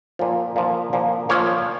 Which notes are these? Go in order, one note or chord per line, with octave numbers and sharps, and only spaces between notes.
A#2 F3
A#2 F3
A#2 F3
A#2 F3 C#5